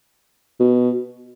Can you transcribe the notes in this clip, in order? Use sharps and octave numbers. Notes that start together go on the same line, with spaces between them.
B2